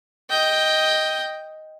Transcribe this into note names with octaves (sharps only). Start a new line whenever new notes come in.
D#5 G5